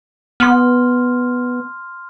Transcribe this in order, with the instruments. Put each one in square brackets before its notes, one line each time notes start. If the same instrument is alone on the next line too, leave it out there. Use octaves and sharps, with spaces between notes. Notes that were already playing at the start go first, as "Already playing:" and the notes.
[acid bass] B3 [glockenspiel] C6 F6